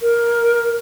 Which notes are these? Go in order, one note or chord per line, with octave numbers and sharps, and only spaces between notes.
A#4